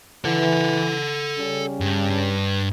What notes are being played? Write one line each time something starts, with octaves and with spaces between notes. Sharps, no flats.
E3 A4 F#5
C#3 G3 C#4
G2